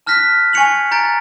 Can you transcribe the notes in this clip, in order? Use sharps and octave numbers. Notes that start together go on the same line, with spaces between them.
A5 F6 F#6 A#6 B6
G#5 C#6 G#6 C#7 F7 F#7
A#5 G6 A6 D7